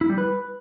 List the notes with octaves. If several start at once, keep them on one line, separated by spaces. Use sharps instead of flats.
E4
G3
B4